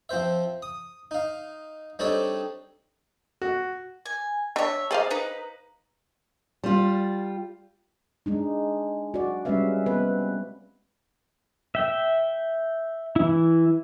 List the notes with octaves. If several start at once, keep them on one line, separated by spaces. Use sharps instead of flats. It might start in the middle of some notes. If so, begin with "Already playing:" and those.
F3 C4 C5 E5
D#6
D#4 F5
G3 C4 D4 D#4 A4 C#5
F#4
G#5
D4 C#5 E5
G#4 C5 D5 D#5 F5
D#4 B4
G3 F4
G#3 D4 D#4
F#4 D5
G3 G#3 C#4 B4 E5 F5
B3 C4 B4
E5 G5
E3 E4